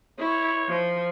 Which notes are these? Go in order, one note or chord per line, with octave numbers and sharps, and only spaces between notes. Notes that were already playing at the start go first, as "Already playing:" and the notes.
E4 C#5
F3